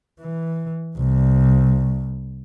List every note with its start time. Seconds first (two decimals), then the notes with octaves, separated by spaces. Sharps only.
0.20 E3
0.97 C2